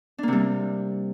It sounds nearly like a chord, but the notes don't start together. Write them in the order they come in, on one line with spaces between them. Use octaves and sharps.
D4 A#3 C3 G3